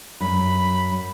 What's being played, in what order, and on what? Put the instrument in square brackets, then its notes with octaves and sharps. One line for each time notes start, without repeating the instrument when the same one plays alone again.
[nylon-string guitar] F#2 [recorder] B5